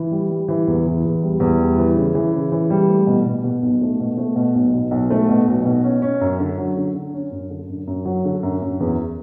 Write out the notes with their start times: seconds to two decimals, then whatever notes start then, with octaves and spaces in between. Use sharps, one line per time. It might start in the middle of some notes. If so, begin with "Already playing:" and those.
Already playing: E3
0.11 G3
0.29 G3
0.48 E3
0.67 E2
0.86 E3
1.04 E2
1.23 G3
1.40 E2
1.60 G3
1.78 E3
1.96 C#3
2.15 E3
2.33 C#3
2.52 E3
2.70 G3
2.89 A3
3.07 B2
3.26 B2
3.44 B2
3.62 B1
3.81 A3
4.00 B2
4.17 A3
4.36 B2
4.55 B1
4.74 B2
4.91 B1
5.10 A3
5.29 B2
5.48 B1
5.65 B2
5.84 C#4
6.02 C#4
6.21 F#2
6.40 D3
6.58 F#3
6.77 D3
6.94 D3
7.14 C#4
7.32 F#2
7.50 D3
7.69 F#2
7.87 F#2
8.05 F#3
8.25 D3
8.43 F#2
8.62 F#2
8.80 E2